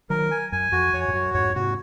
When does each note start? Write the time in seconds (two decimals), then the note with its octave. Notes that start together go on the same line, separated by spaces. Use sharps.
0.10 D#3 F#3 A#4
0.31 G#5
0.52 F#2 G#5
0.72 F2 F#4
0.93 F2 C#5
1.08 G#2
1.14 F#2 F#4
1.34 F2 G#2 C#5
1.55 G#2 C3 F#4